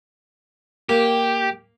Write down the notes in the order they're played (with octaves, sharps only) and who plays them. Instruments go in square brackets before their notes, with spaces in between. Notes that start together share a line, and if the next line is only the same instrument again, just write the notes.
[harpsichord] A#3 [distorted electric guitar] G4